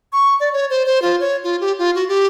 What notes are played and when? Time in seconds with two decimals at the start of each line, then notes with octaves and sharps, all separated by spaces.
0.13 C#6
0.40 D5
0.53 C#5
0.70 C5
0.86 C5
1.02 F4
1.20 C#5
1.44 F4
1.61 G4
1.79 F4
1.95 F#4
2.08 G4